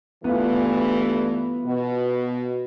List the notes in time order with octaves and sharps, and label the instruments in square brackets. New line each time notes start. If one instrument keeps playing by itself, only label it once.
[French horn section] G2 E3 A3 [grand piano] B3 F4
[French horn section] B2